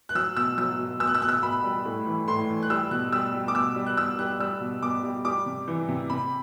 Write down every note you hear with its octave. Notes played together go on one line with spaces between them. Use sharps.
F#6
F#3 E6
B2 E6
F#3 E6
B2
B2 E6
F#6
E6
B2 F#6
E6
B2 B5
G3
A2
E3
A2 C6
E3
F#6
G3 E6
B2 F#6
G3 E6
G3
D6
B2 E6
G3
F#6
B2 E6
G3 F#6
G3 E6
B2
B2 D6
G3
G3 D6
C3
E3
C3
C3 B5